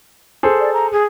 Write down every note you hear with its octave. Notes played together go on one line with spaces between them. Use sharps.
G#4 A4 C5
D5
A#5
G#4